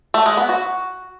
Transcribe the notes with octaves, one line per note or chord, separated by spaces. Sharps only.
A3
G#3
B3
F#4